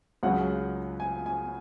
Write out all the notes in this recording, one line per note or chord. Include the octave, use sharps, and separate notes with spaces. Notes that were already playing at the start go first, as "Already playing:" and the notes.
C#2 C#3 F#3 F#5
G#5
G#5